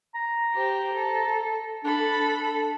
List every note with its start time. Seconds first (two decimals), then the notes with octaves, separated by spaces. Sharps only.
0.15 A#5
0.54 G4 C5
0.93 A4
1.84 D4 A4 B5
2.24 D4